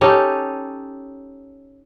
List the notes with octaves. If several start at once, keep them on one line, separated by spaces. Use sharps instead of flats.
C#4 D#4 G4 A4